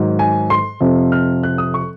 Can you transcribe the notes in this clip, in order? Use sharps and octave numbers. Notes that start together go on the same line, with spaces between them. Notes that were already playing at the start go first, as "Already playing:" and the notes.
Already playing: G#2 D#3 F#3
G#5
C6
F2 C3 F3
F6
F#6
D#6
C#6